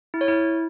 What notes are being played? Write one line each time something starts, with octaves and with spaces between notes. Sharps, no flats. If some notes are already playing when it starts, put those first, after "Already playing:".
E4
C#5
E4